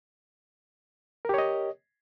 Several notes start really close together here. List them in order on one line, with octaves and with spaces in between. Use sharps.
A#4 G4 C#5 D#5